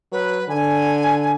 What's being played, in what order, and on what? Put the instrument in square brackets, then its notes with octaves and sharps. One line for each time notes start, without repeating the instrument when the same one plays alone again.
[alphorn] F#3 [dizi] B4
[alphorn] D3 [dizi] G#5